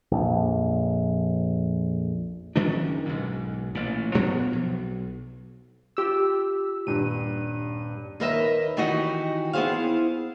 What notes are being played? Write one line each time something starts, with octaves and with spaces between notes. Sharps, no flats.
A#1 F2
F#1 D#3 C#4 D4
B1 G#2
A1 A#2
A#2 F3 B3 D4
B1
F4 G4 E6
D#1 G2 D#7
D#2 D#4 A#4 B4 D#5 E5
D#3 E3 D#4 F#4 G4 D#5
B3 E4 G#4 C5 F5